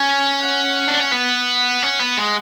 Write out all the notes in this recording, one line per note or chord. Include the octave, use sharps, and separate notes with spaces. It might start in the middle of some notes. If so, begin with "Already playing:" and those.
Already playing: C#4 G#5
F#5
D4
C#4
B3 F#5
C#4
B3
G#3